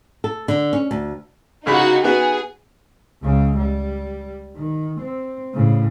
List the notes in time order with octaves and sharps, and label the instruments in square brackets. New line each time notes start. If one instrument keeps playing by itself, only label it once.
[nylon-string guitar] A4
D3
C#4
D2
[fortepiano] C2 C#3 B5 [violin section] D#4 F#4
[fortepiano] B3 F#4 [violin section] G#4
[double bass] C#2 C#3
G3
D#3
C4
A2 C#3